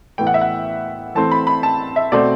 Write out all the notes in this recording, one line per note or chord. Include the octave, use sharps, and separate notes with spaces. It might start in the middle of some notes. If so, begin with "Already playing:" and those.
A2 E3 B3 G5
F#5
E5
F#5
E3 A3 C4 A5
B5
B5
A5
E5
B2 A3 C4 D5